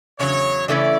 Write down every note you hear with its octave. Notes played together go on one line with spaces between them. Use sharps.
E2 C#3 F#3 C#5
C#3 E3 A3 C#4 E4 D5